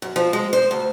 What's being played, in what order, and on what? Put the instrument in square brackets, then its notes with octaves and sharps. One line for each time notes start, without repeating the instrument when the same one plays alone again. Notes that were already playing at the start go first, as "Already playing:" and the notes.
[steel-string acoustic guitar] F#2
F3
G#3
C5
D2